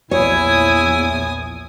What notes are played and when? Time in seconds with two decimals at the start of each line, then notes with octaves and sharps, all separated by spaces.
0.11 A#1 E2 E4 C#5 G#5 D#6